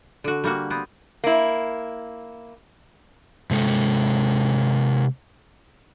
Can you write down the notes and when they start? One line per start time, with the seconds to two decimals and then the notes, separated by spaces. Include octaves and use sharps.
0.24 D3 F#4
0.44 G3 A#3 F#4
0.70 B3 C4
1.24 A#3 E4
3.51 C3 G#3 A4